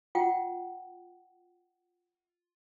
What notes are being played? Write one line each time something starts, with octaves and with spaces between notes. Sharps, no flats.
F4 F#5 G5